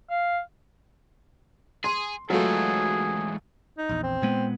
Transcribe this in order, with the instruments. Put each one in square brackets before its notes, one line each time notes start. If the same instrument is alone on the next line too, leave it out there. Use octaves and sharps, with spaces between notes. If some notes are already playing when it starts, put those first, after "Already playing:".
[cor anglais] F5
[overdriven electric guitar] G#4 [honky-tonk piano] C6
[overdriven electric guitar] G#2 E3 [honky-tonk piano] F#3 [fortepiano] A3 F4 [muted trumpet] G#4
[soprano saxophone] D#4
[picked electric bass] A#1 E2
[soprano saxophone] C4
[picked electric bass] A#2 G#3 B3